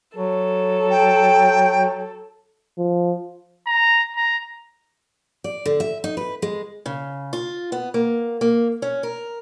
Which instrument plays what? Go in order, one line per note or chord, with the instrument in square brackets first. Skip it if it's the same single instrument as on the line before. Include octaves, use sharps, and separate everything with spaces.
[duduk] F#3 [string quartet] A4
[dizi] G5
[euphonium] F3
[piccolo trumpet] A#5
A#5
[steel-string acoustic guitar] D5
D3
E5
D#4
B4
G#3
C#3
F4
B3
A#3
A#3
C#4
A#4